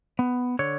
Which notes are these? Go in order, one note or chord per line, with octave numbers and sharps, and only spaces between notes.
B3
D3 C#5